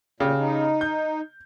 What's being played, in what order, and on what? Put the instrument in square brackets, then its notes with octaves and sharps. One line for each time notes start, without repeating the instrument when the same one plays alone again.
[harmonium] A#2 [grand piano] C#3 G4
[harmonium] D#4
[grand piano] G6